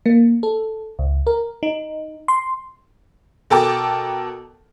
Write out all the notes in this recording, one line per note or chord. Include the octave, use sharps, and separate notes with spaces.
A#3
A4
C#2
A#4
D#4
C6
B2 A4 A#4 G5 A5 D6